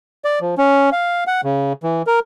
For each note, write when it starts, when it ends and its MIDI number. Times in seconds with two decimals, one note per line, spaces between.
0.25 0.39 74
0.41 0.55 53
0.58 0.90 61
0.92 1.24 77
1.27 1.41 78
1.44 1.73 49
1.83 2.02 52
2.07 2.20 70